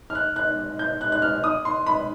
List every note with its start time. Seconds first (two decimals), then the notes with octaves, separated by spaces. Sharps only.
0.10 F6
0.15 F#6
0.36 F#6
0.79 G6
1.01 F#6
1.12 F#6
1.22 F6
1.44 D#6
1.65 C6
1.87 B5